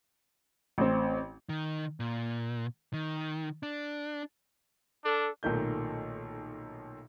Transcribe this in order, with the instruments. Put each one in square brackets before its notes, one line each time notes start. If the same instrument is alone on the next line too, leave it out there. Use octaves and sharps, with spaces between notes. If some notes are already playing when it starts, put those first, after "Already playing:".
[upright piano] A1 C4
[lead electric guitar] D#3
A#2
D#3
D4
[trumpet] D4 [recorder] A4
[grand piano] B1 A#2 D#3 A3 G6